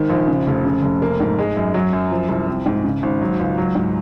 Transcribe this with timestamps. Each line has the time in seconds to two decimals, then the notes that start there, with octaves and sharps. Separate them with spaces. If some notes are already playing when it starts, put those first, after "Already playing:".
Already playing: G#1 D#3
0.09 A#1
0.28 C#3
0.47 F1
0.65 C#3
0.82 F1
1.02 A#3
1.20 G#2
1.39 G#3
1.57 F#2
1.74 F#3
1.93 F#2
2.12 F3
2.29 C2
2.47 C4
2.66 G#2
2.84 C#3
3.03 G#1
3.21 F#3
3.40 C#2
3.58 F#3
3.75 G#2